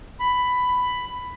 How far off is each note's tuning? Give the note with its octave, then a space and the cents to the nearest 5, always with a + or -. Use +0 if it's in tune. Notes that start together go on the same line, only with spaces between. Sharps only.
B5 +10